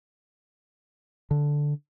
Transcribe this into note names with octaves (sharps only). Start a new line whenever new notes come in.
D3